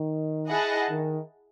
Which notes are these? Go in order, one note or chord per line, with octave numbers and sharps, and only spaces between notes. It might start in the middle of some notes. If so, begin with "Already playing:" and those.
Already playing: D#3
E4 G#4 D#5 F#5 A5
D#3